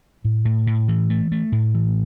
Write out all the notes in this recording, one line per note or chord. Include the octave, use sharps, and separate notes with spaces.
A2
A2
A2
E3
A3
A3
A2
E3